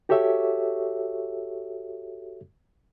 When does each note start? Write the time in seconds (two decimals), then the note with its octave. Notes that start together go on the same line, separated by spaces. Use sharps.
0.09 F#4 G4 A4 C#5 E5